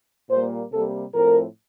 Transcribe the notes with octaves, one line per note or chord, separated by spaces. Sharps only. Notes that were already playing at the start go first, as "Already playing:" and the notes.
A#2 G3 A#3 C5
C3 G3 A#3 A4
A2 F3 A3 C4 A#4